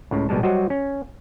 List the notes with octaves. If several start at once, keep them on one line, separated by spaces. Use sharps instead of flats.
C#2 A2 C#3
A#1 B2 G3 G#3 A5
F#3 G3 F#4 C5 D#5
C#4